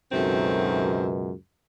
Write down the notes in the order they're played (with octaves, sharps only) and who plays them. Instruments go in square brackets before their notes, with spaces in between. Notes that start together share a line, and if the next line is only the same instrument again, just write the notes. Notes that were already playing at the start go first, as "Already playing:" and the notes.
[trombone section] C#2 F#2 B2 [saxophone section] D#3 A3 C4